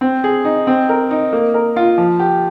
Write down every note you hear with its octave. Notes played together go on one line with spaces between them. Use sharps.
C4
G#4
D#4
C4
A#4
D#4
A#3
A#4
F4
F3
G4